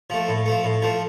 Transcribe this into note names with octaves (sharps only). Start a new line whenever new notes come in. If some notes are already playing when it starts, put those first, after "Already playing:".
F3 A3
A2
F3 A3
A2
F3 A3